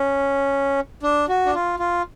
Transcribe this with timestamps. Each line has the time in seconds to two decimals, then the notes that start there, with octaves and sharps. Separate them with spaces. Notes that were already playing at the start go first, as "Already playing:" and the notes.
Already playing: C#4
1.03 D4
1.29 F#4
1.46 D4
1.55 F4
1.79 F4